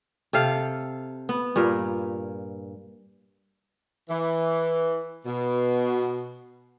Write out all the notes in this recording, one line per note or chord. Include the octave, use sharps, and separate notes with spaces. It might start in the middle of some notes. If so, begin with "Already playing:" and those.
C3 A4 F5
B3
G2 A#2 A#4
E3
B2